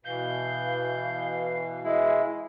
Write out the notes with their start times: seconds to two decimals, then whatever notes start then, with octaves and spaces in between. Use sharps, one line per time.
0.05 B2 E3 F5 G6
1.84 G#3 E4